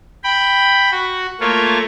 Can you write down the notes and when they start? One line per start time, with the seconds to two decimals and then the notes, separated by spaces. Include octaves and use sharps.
0.24 G5 B5
0.92 F#4
1.40 A3 A#3 F4 C#5